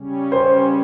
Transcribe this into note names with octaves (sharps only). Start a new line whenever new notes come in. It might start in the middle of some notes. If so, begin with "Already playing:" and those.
Already playing: C#3 G3 C#4
C5